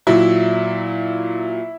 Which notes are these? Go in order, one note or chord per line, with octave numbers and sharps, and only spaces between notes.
A#2 F#3 E4